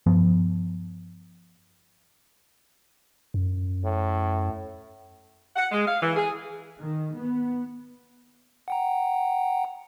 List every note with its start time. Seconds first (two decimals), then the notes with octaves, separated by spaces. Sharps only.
0.06 G2 F3 B3
3.34 F#2
3.84 A2
5.56 F#5
5.71 G#3
5.86 F5
6.02 E3
6.16 G#4
6.78 D#3
7.16 B3
8.68 F#5 G5 A#5